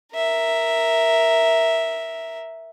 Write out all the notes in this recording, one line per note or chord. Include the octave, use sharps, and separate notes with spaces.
A#4 E5